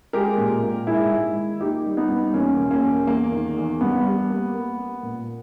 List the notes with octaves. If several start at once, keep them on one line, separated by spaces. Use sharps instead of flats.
G#3 G4 A#4
A#2
A#2
G#2 E4 G#4
G#2
D#3
A#3 D#4 G4
G3
B3 D#4
G2
E2 A#3 C#4
B2
A#3 C#4
E2
E2 A#3
D#3
E2
G2 B3
G3
A#3
A#3
A#3
A#2